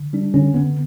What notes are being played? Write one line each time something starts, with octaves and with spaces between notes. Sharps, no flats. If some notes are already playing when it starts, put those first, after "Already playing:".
Already playing: D3
G3 D4
D3 C#4
D3 B3